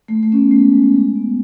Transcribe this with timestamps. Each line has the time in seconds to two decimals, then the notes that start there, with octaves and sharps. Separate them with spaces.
0.08 A3
0.23 A3
0.32 C#4
0.37 B3
0.51 A3
0.62 G#3
0.72 G#3
0.83 A3
0.94 G#3
1.15 B3